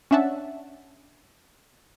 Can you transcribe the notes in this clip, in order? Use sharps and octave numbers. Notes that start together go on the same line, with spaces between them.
C#4 D4 E5 F#5 A5